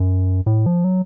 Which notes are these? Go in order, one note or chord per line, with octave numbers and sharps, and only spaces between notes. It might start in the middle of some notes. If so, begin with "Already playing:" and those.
Already playing: F#2
A2
F3
F#3